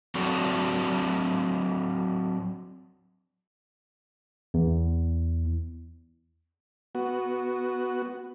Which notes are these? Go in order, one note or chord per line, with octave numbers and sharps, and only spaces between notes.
F#3 C4 D4 F#4 A4 D5
E2
B3 F#4